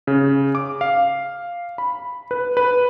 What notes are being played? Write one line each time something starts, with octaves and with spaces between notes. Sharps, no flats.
C#3
D6
F5
B5
B4
B4